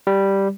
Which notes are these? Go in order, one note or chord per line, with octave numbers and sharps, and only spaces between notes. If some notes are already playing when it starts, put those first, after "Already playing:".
G3